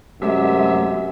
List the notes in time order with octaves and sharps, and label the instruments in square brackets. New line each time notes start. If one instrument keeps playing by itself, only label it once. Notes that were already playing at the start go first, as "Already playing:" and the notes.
[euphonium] F#2 [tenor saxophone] C3 [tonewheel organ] G#3 A3 E5